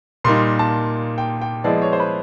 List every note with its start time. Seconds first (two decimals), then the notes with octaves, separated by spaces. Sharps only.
0.24 A#2 G3 A#3 D#4 C6
0.59 A5
1.18 G5
1.42 G5
1.64 F3 G#3 B3 E4 D5
1.82 C#5
1.93 C5
2.00 B4